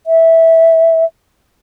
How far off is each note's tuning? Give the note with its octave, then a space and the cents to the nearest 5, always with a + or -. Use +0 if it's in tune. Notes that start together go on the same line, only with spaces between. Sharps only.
E5 -10